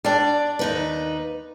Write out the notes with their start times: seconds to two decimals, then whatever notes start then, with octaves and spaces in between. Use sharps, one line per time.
0.05 G3 D4 D5
0.59 D#2 D#4 B4